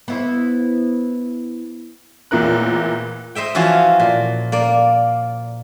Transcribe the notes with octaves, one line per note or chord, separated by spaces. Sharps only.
B3 E4 C5
A1 E2 A#2 E4 A#4 F#6
C5 D#5 E5 G5
E3 F3 C#4 F4 F#4 C5
A#2
A#3 D5